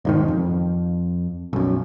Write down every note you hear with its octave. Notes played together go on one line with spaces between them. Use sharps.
E1 G#2 D#3
F2
B1 F#2